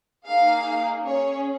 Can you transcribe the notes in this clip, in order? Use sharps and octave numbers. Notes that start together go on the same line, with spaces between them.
A#3 D#4 G#4 F5
C#4 G#4 C#5